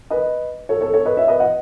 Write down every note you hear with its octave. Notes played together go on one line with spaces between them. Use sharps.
B4 D#5
A4 C#5
A4 C#5
A4 C#5
B4 D#5
C#5 E5
B4 D#5
D#5 F#5